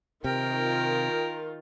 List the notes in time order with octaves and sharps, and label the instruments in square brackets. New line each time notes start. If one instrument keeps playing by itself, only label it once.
[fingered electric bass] C3 [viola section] D#3 F4 [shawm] A#4 [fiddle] G5